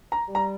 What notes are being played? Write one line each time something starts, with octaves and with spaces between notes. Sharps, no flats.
A#5
G3
A#5